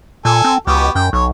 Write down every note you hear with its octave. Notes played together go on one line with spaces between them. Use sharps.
A#2 A4 G#5
C4
C#2 B3 F#4 G4
F#2 G5
B1 C#5